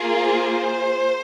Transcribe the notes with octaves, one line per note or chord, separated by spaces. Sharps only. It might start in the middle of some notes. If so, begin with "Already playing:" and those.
Already playing: A#3 F4 G#4
C5